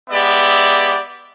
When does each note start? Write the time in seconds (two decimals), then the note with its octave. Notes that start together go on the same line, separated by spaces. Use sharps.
0.10 G#3 B3 G4 D5 E5